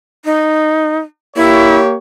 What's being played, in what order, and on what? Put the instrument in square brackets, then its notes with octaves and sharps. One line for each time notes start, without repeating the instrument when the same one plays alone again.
[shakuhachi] D#4
[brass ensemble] A#3 G4 C#5 [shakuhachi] E4